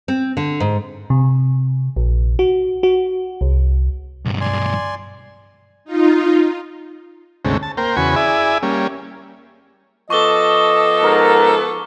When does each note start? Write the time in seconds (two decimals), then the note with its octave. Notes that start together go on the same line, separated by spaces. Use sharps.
0.08 C4
0.37 D3
0.60 G#2
1.10 C3
1.96 A#1
2.39 F#4
2.83 F#4
3.41 C2
4.25 B1 G2
4.41 D5 G#5 C6
5.85 D#4 F4
7.45 D2 G#2 C3 A3 C#4
7.63 A5
7.77 A#3 A#4 C5 G5
7.96 E2 C#3 F#4 G#5 B5 C#6
8.16 E4 G#4 D5 E5 G#5
8.63 G3 A#3 C#4
10.10 F3 B3 A4 D#5 C#6 D6 G7
11.01 G#2 A#4